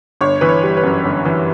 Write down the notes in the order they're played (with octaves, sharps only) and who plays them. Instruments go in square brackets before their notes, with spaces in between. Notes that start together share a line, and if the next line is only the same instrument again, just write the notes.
[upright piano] G1 C#5
E3 B4
C#5
G3
B4
F#2
G1
E3